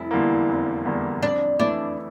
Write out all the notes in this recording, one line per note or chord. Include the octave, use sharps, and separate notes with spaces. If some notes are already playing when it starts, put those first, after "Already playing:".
Already playing: F1 E4
E2 D3 G3 A#3
F1
E2 D3 G3 A#3
F2 D4
E3 A3 D4 E4